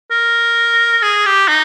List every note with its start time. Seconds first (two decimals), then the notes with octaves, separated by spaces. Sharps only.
0.11 A#4
1.03 G#4
1.26 G4
1.48 D#4